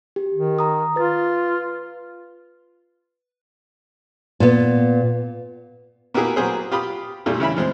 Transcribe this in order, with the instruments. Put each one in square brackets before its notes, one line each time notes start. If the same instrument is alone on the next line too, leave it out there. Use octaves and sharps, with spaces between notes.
[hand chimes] G4
[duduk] D#3
[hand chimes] A#5 D#6
[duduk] F4 [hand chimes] B4 A6
[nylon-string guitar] A#2 B3
[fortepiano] A#3 B3 E4 G4 G#4 A#4
F#3 A#3 B3 G#4 C5
F4 G4 B5 D#6
A#2 G3 A3 E4 F4
C#3 E3 E5 B5
F3 G#3 C4